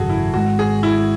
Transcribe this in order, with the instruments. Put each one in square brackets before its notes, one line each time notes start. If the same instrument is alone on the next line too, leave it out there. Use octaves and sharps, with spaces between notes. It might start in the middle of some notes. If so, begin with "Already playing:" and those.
Already playing: [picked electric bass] G#1 F#2 C#3 [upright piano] F#4 G#4 A4
[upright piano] E4
[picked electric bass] G#1 G#2 G#3 [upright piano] F#4
[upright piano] G#4
E4